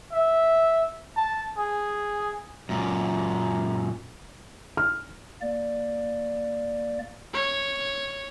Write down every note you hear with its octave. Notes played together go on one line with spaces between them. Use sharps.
E5
A5
G#4
F#2 A#2
F6
A#3 D5
C#5